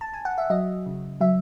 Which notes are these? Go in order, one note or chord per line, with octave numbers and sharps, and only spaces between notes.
A5
G#5
F#5
E5
F#3 D#5
C#3
F#3 E5